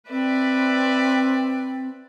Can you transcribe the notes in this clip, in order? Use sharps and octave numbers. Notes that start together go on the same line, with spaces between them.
C4 B4 D5 E5